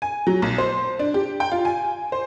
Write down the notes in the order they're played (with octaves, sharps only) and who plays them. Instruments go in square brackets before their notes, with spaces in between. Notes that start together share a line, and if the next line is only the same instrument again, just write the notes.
[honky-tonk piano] G#5
F#3
B1
C5
D4
G4
G5
F4
G#5
C5